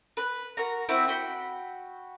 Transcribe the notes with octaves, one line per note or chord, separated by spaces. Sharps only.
B4
F#4 A#4 A#5
C4 E4 F#4 E5
F#4 G5 B5